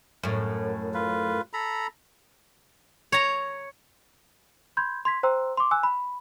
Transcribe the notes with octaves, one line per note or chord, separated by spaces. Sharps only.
F#2 A2
F4 B4
A4 A#5 B5
C#5 A#5
B5 C6 G6 G#6
C6 G#6 B6
C5 G5 A#5 C6 E6
C6 D6
G#5 E6 F#6
B5